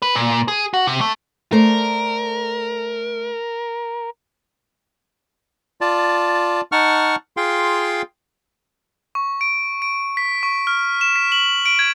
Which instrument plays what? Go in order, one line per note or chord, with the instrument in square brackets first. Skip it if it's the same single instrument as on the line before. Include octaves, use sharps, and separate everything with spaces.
[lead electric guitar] B4
A#2
G#4
F#4
C3
A3
[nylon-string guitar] A3 C5 D5 [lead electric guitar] A#4
[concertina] F4 D5 A5
D#4 F#5 A5 C#6 F6
F4 G#4 F5 G5 C6
[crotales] C#6
D7
D7
B6
C#6
F6
E7
B6
F#7
D7
G#6